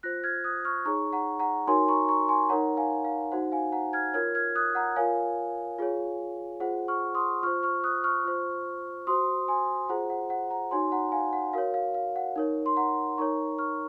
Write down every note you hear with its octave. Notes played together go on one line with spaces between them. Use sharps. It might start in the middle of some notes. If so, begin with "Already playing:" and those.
F4 C5 F#6 A#6
F6 G#6
D#6 F#6
C#6 F6
D#4 G#4 C#5 A#5 C#6
F#5 A#5
F#5 A#5
D#4 F#4 A#4 C#5 G#5 C6
A#5 C#6
A#5 C#6
G#5 C6
D#4 A#4 C#5 F#5 A#5
F5 G#5
F5
D#4 F#4 C5 F#5
F5 G#5
F#5 A#5
F6 G#6
F4 A#4 C#5 F6 G#6
F6 G#6
D#6 F#6
F#5 A#5
F4 A#4 C#5 F5 G#5
F4 G#4 C#5
F4 G#4 C5 F#5
C#6 F6
C6 D#6
F4 C5 C#6 F6
C#6 F6
D#6 F#6
C#6 F6
F4 C5
F#4 C5 C6 D#6
G#5 C6
F4 G#4 C5 F#5 A#5
F#5
F#5
F#5 A#5
D#4 F#4 C#5 G#5 C6
F#5 A#5
F5 G#5
F#5
F#4 A#4 C#5 F5
F5
F5
F#5
D#4 A#4 C#5
C6
F#5 A#5
D#4 A#4 C#5 A#5 C#6
C#6 F6